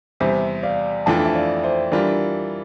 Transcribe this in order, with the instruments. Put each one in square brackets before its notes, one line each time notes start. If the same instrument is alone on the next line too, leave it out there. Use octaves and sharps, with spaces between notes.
[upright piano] E2 C3 G3 [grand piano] C5 E5
[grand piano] D5 F5
[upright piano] F2 E3 A3 D4 F4 [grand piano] F5 A5
[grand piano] E5
D5 F5
C5 E5
[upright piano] E3 G3 D4 F4 [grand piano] A#4 D5